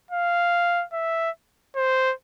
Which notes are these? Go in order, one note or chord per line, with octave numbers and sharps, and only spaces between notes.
F5
E5
C5